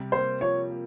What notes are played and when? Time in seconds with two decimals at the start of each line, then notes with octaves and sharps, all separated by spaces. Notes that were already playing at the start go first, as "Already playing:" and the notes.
Already playing: C3 G3
0.12 A#3 C5
0.41 F3 C#5
0.70 A#3